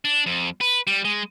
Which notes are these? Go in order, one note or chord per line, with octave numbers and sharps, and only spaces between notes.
D4
F2
B4
G3
G#3